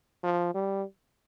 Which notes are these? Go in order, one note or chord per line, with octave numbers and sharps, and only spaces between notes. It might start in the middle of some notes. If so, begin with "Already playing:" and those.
F3
G3